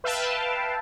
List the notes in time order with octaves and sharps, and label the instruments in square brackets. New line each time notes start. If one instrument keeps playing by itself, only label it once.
[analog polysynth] B4 E5 F5 G5 A5